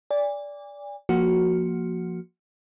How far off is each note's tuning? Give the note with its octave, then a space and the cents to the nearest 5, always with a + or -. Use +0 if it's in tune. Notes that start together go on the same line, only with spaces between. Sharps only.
D5 -15 G#5 -35
F3 +0 A#3 +0 F#4 +0